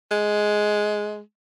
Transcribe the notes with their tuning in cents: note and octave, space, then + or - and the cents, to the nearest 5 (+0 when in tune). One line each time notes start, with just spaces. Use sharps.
G#3 +10